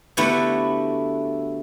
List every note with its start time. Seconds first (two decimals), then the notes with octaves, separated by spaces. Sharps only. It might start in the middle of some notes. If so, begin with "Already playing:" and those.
0.17 D3 A3 B3 E4 F#4 G4